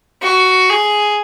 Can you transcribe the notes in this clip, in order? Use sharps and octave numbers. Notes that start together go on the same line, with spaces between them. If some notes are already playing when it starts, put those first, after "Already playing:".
F#4
G#4